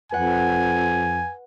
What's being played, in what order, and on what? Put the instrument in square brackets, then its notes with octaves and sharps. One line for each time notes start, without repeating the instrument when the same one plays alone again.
[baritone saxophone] F2 [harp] B4 F#5 [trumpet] G#5